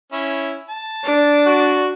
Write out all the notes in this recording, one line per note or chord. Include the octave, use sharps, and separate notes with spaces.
C#4 E4
A5
D4
F#4